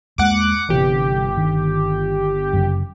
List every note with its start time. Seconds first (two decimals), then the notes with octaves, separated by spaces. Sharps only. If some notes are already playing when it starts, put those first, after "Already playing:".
0.18 E2 G#3 A#3 F#5 D6
0.69 G1 C3 E3 G4
1.37 D#3
2.53 F#2 C#3